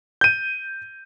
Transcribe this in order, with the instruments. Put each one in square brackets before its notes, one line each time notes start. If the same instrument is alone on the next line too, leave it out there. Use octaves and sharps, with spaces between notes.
[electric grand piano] G6 D#7